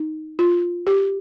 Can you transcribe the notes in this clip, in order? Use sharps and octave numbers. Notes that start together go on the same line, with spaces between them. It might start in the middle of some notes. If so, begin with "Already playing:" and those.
Already playing: D#4
F4
G4